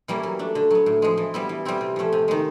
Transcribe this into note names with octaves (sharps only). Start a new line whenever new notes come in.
E3 G3 A#3 C#4
F#3
A3 D4
D3
F#3 B3
A2
F3 G#3
E3
G3 B3 E4
E3
G3 C4 E4
C3
F3 A3 C#4
C3
D#3 G#3